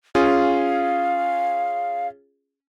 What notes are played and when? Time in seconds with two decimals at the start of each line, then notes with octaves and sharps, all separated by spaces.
0.15 C#4 F4 G#4 F5